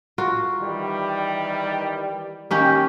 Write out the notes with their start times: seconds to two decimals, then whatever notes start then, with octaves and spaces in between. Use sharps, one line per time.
0.18 F4 F#4 A#4
0.60 D#3 E3 G3
2.51 D#3 A#3 C#4 G4